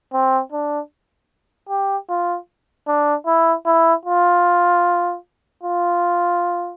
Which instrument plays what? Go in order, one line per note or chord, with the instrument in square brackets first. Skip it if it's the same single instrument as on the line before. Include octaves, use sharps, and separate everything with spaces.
[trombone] C4
D4
G4
F4
D4
E4
E4
F4
F4